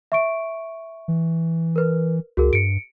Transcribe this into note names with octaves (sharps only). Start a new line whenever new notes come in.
E5 C#6 D7
E3
A#4 B4
C#2 F#4 G#4 A#4
G2 C#7 D7